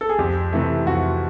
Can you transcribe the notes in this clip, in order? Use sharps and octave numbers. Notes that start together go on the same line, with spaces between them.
A4
G#4
F2 G4
C3 E3 A3
F2 F#4